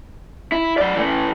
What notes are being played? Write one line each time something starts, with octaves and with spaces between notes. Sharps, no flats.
E4
F#3 D5
E3 A3